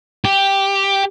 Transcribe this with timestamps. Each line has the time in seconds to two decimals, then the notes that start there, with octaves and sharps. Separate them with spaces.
0.25 G4